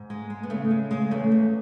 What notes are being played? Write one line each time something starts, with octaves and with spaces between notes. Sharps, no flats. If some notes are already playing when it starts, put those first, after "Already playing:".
Already playing: G#2
G#3
G#3
B3
C#3 A3
G#3
C#3 G#3
E2 A3
E2